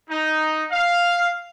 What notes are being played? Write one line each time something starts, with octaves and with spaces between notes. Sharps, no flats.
D#4
F5